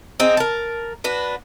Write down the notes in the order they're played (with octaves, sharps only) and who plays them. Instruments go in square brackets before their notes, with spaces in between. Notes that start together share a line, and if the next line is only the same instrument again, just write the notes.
[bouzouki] C4 D#4 G#4
A#4 A5
D4 F#4 B4